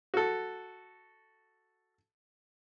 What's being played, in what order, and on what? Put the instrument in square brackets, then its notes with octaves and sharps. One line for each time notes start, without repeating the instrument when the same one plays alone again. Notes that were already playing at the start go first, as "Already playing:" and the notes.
[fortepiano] F#4 A4